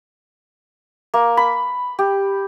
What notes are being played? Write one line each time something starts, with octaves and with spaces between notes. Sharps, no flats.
A#3
B5
G4